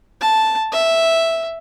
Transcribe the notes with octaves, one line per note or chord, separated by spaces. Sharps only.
A5
E5